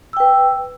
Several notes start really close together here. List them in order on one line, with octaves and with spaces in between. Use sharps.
E6 G5 B4